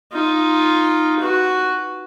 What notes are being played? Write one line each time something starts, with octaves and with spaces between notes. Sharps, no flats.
D#4 F4
F#4 B4